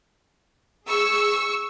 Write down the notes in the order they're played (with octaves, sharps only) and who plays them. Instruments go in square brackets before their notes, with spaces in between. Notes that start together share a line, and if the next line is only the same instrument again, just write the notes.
[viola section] G#4 [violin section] C#6 E6